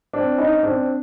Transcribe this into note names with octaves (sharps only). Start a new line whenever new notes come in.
C4 D4
C#4 D#4
C4 D4